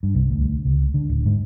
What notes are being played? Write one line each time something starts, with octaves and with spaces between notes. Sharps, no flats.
G2
C2
D2
C#2
D3
D1
G#2